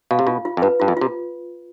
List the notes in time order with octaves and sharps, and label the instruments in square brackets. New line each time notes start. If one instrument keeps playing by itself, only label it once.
[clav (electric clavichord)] B2 [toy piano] F5
[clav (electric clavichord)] C3
[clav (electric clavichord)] B2 [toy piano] F4
[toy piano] F4
[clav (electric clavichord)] F2
[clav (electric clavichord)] G2 [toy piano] B4
[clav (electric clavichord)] G2 [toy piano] F4
[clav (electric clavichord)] F2
[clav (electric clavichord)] C3 [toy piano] F4